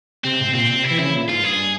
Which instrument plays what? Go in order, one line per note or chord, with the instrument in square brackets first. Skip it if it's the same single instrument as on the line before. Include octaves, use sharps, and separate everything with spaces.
[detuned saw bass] C3 [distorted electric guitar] C4
[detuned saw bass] G#2
C3
[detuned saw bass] A#2 [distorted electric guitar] C4
[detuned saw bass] C3
[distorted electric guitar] E4
[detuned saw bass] E3
[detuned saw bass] C#3 [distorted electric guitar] E4
[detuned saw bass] A#2
[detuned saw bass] G#2 [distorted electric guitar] F4
[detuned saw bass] G2 [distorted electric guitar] G#4